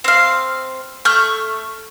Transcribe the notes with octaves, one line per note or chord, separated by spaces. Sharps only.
C4 F5
A3 C#6 F6 G6